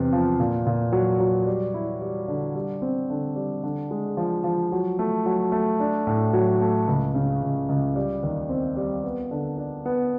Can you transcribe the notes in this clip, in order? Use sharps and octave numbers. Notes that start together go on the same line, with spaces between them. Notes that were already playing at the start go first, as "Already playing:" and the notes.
Already playing: E2 C3
F3
A#2
A#2
F#3
F#3
G3
E4
G3
D3
G3
C4
D3
G3
D3
G#3
F3
F3
F#3
A3
F#3
A3
D4
A2
F#3
A3
C#2
C#3
C#2
C#2
G3
D#2
C4
G3
B3
D3
D4
B3